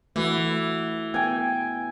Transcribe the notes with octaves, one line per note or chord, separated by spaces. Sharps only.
E3 A3 F#4 B4
B3 G5 G#5